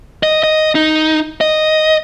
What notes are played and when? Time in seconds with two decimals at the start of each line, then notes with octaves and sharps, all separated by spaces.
0.23 D#5
0.43 D#5
0.75 D#4
1.41 D#5